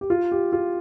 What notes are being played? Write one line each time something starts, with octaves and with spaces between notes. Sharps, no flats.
G4
F4
G4
F4